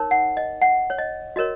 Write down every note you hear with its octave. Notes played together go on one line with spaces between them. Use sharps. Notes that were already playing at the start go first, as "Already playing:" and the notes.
Already playing: D#4 A#4 C#5
F#5
D#5
F#5
C#5
D#5
F#4 A#4 C#5 D#5